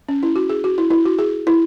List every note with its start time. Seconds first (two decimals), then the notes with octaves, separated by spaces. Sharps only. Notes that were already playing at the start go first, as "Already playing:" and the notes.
0.08 C#4
0.23 E4
0.36 F#4
0.50 G#4
0.64 F#4
0.78 E4
0.90 E4
1.05 F#4
1.19 G#4
1.47 E4